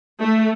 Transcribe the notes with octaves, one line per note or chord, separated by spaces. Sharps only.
A3